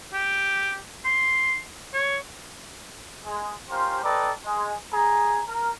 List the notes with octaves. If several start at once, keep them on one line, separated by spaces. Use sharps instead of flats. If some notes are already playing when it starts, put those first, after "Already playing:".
G4
C6
C#5
G#3
C#4 F4 G4 A#4 C5
A4 B4 D5 D#5 G5 A#5
G#3
G#4 A#5
A#4